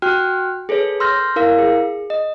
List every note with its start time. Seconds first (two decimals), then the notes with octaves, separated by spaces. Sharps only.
0.02 F#4 G5 F6 F#6
0.69 G#4 A4 B4 C#5
1.00 C6 E6 F6 G6 A#6
1.36 E4 A#4 F5 E6
1.58 G#4
2.10 D#5